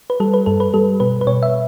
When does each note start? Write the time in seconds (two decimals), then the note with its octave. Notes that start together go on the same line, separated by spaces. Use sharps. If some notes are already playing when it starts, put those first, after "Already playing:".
0.10 B4
0.20 G3 A4
0.34 B4
0.46 G2 A4
0.60 B4
0.74 G3 A4
1.00 B2 B4
1.21 B4
1.27 B2 C#5
1.43 E5